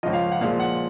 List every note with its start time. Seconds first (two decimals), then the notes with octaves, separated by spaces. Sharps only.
0.03 C#2 C#3 F3 D#5
0.13 F5
0.32 F#5
0.41 A#2 F3 G#3 F5
0.60 F#5